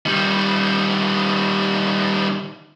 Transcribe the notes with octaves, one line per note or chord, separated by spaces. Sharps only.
D#3 G3